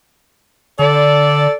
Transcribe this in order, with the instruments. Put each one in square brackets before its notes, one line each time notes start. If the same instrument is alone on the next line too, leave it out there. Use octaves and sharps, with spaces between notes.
[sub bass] D3 [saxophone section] A4 D5